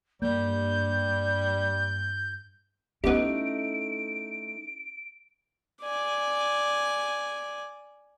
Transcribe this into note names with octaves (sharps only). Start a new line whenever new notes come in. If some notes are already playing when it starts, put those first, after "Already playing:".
G2 G3 A#3 G6
G3 A3 B3 C#4 D#4 E4 D7
D5 G#5